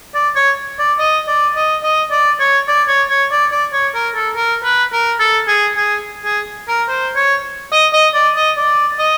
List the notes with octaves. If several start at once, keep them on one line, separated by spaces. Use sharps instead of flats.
D5
C#5
D5
D#5
D5
D#5
D#5
D5
C#5
D5
C#5
C#5
D5
D5
C#5
A#4
A4
A#4
B4
A#4
A4
G#4
G#4
G#4
A#4
C5
C#5
D#5
D#5
D5
D#5
D5
D#5